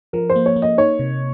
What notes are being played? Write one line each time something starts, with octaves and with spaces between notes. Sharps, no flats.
F3 A#4
C5
A#3
C#5
A#3
D#5
D#4 C#5
C3